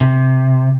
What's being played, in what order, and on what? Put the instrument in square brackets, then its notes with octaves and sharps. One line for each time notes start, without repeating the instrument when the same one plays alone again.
[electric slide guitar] C3